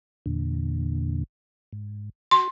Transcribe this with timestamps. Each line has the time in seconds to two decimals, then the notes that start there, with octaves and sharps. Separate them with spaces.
0.26 E2 A#2 D3
1.73 G#2
2.31 F#4 C6